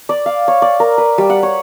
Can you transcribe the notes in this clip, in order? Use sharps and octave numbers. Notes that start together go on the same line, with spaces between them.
D5
F5
C#5
D5
A#4
B4
G3
F#5
C#5